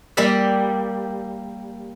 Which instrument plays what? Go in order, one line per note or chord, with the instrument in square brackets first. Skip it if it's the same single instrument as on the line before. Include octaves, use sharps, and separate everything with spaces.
[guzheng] G3 A#3 G4 D5 E5